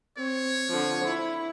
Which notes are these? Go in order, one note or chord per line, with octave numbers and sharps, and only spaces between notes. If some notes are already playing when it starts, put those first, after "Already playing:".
C4 C#5
D3 F3
E4